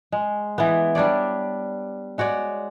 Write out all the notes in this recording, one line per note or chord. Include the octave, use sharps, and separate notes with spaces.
G#3
E3 B3
G3 D4 C#5 D5
G#3 F#4 C#5 D5